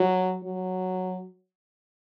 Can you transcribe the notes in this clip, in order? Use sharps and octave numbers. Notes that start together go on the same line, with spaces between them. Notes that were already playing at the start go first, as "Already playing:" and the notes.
Already playing: F#3
F#3